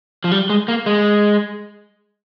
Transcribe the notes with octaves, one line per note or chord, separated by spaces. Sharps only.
F3
G3
G#3
A#3
G#3